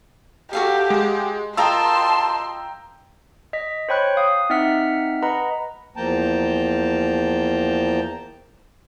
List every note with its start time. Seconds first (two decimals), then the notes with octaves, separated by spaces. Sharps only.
0.53 F#4 G4 A4 F5
0.90 G#3
1.57 F4 A#4 D#5 G5 A5 A#5 C6 E6
3.53 D#5 B6
3.89 C5 C#5 G5 B5 F#6
4.17 F5 D#6
4.50 C4 D#4 E5 F#5 F6 B6
5.22 B4 D#5 F#5 A#5 B5
5.97 E2 F3 A#3 G5 A5 A#5